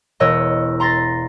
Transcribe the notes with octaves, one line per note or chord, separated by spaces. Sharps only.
E1 A#4 C#5 D#5 E6 F#6
A#5 C6 A6 A#6